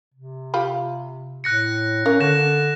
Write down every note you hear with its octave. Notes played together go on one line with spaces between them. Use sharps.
C3
F4 G4 B5
A2 F#6 A#6 C#7
C#4 A#4 F5
D3 F#6 A#6 E7